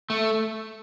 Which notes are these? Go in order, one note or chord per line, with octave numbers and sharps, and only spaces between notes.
A3